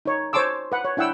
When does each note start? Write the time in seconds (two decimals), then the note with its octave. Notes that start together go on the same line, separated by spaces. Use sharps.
0.05 D#4 C#5
0.33 C5 C#5 A5 C6 D6 E6
0.72 B4 F#5
0.85 C#5
0.97 D4 E4 F#5 G5 E6